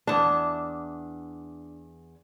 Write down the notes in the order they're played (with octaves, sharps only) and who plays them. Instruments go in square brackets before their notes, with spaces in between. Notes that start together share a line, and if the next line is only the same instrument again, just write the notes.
[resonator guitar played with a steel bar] E2 A5 [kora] D4